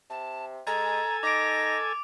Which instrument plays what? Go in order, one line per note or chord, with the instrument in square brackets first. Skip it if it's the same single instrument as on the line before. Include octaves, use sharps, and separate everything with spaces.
[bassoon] C3 [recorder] A5
[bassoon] G#3 [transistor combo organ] A4 G#5 [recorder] A#5
[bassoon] D#4 [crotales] D6 D7 [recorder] A#6